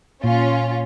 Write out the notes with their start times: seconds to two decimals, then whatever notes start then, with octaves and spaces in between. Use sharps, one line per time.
0.23 A#2 C#4 F4